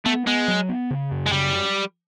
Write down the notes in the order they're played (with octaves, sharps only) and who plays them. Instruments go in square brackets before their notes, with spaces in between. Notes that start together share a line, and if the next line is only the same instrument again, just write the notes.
[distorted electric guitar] A3 [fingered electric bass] B3
[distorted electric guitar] G#3 [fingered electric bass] B3
[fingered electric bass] F#3
B3
C#3
F#2
[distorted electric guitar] G#3
[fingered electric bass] C#3 [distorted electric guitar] G3